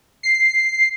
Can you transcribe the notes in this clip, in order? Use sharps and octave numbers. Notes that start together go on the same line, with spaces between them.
C7